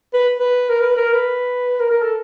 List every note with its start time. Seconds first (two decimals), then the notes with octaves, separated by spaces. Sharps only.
0.14 B4
0.40 B4
0.69 A#4
0.80 B4
0.97 A#4
1.13 B4
1.80 A#4
1.91 A#4
2.02 A4